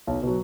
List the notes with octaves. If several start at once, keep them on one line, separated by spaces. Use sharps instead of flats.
B1
B2 F#3